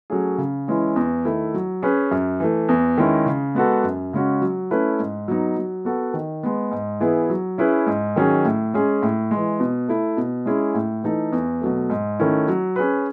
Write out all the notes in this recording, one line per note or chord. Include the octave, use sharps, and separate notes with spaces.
F#3 A3 C#4 G#4
C#3
E3 G#3 C#4 E4
E2
D#3 A3 E4
F#3
C#4 G#4 B4
F#2
E3 A3
E2
D#3 G#3 C#4 E4
C#3
G#3 B3 F#4 A4
F#2
C#3 G#3 C#4 F#4
F#3
A3 C#4 E4 B4
G#2
F#3 B3 D#4
F#3
B3 F#4 A4
D#3
G#3 B3
G#2
E3 B3 E4 G#4
F#3
C#4 E4 G#4 B4
G#2
D#3 F#3 C#4 G#4
A2
G#3 C#4 G#4
A2
E3 G#3
B2
A3 E4
B2
G#3 C#4 E4 G#4
A2
E3 A3 D#4 A4
E2
B2 F#3 A3
G#2
D#3 A3 C#4 E4
F#3
C#4 G#4 B4